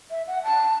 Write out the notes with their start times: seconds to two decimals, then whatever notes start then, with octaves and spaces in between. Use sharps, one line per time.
0.11 E5
0.27 F#5
0.44 A5